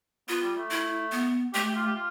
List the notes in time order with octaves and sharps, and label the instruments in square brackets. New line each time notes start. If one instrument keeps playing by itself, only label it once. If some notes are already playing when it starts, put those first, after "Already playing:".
[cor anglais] B3 [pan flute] F4
[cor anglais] G3
A3
[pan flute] E4
B3
[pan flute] A3 [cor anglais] G4
[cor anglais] G4
F4
G4
F4